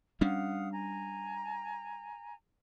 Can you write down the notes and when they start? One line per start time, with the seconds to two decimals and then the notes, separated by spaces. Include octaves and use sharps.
0.21 G3 C#4 D4 F5 F#5 D#6
0.72 G#5 A#5